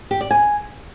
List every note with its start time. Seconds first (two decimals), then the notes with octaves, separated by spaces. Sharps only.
0.11 G4
0.21 D5
0.31 G#5